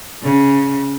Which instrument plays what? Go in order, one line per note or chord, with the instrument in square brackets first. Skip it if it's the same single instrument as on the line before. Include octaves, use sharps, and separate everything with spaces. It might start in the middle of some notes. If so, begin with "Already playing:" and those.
[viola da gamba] C#3